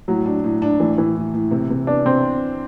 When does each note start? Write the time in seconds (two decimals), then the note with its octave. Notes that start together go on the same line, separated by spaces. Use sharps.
0.08 A2 F#3
0.26 D4
0.44 A2
0.62 D4
0.80 A2 E3
0.98 A2 E3
1.16 A2
1.34 A2
1.51 C3
1.70 C3
1.87 B3 D4
2.05 C3 C4